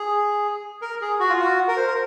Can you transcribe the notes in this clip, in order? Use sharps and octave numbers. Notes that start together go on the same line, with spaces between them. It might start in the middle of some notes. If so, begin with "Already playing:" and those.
Already playing: G#4
A#4
G#4
F#4
F4
F#4
A#4
C5
A#4